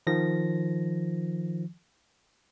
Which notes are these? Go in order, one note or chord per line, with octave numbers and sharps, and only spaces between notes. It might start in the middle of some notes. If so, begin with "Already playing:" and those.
D#3 F3 A#6